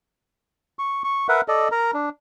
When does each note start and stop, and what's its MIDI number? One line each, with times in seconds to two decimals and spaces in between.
0.79 1.03 85
1.04 1.27 85
1.29 1.41 70
1.29 1.41 71
1.29 1.41 76
1.29 1.41 78
1.48 1.68 69
1.48 1.68 74
1.48 1.68 75
1.72 1.91 70
1.72 1.91 82
1.94 2.09 62